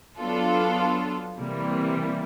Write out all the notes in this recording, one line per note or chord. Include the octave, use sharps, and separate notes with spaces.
F#3 B3 D4 F4 A4
C3 E3 G3 A#3